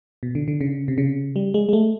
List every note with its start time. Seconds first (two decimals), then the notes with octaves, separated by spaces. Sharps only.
0.23 B2
0.35 D3
0.48 D3
0.61 C#3
0.88 C3
0.98 C#3
1.36 G3
1.54 G#3
1.69 G#3
1.73 A3